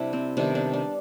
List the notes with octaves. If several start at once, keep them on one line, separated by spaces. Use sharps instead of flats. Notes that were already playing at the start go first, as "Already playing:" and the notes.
Already playing: C3 G3 D4 E4
C4
C3 D#3 G3 B3 D4
D4
D4